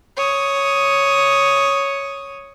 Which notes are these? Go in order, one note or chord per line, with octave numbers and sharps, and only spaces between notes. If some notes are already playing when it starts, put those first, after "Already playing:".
C#5 D#6